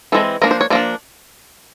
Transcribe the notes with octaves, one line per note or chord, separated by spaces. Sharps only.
E3 G#3 C4 A4
F3 A#3 D4 A#4
C5
C#5
F3 A#3 D4 D5